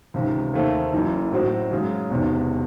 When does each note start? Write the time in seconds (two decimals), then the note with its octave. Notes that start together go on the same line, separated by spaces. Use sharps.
0.14 C#2 C3 D#3
0.54 D#2 D#3 A3 C4
0.93 F#1 F#2 E3
1.32 A2 F#3 C4 F#4
1.71 F#2 C#3 G#3 C#4
2.10 E1 E2 C3 D#3